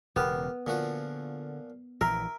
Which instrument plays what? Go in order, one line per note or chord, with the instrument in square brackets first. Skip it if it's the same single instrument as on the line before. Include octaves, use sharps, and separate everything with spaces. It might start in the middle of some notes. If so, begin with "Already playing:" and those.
[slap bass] E1 C#3 [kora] B3 [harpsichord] G4 A#4
[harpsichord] A#2 F3 F#4 [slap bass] D3
[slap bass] A#1 E3 [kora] A#4 [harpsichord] E5